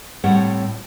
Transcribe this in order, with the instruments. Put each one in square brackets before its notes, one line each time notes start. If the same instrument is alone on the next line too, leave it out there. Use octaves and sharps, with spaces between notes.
[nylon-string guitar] A2 G3 C4 G4 C#5 F#5